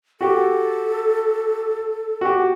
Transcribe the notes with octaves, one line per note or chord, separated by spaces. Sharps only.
F#4 G4 A4
F#4 G4